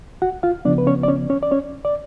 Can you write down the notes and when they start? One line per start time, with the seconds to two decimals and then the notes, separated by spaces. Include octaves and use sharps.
0.22 F#4 F#5
0.43 F4 F5
0.65 C#3 F3 B3 D4 D5
0.78 B4
0.87 C#4 C#5
1.03 D5
1.08 C#4 C#5
1.30 C#4 C#5
1.42 D5
1.51 C#4 C#5
1.85 D5